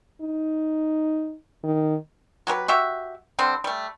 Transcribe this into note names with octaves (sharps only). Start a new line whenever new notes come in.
D#4
D#3
F#3 G4 A#4 B4
F#4 G4 E5
D3 G3 C4
G3 A3